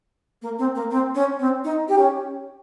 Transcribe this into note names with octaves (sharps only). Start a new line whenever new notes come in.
A#3
C4
A#3
C4
C#4
C4
D#4
G4
C#4